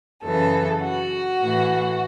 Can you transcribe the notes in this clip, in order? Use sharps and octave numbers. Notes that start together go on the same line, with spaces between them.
F#2 C#3 E3 A4
F#4
A2 E3